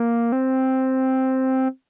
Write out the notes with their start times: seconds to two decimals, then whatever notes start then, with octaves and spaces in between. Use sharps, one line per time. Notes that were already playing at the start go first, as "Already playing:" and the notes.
Already playing: A#3
0.32 C4